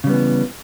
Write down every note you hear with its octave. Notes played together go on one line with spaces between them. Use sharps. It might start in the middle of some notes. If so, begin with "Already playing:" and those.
C#3 E3 G3 B3